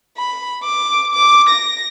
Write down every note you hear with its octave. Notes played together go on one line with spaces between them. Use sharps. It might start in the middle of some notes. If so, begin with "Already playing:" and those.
B5
D6
D6
A#6